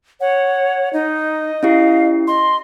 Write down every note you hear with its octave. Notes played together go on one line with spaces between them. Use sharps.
C#5 F#5
D#4 D#5
C#4 E4 G4 F5
D#5 C6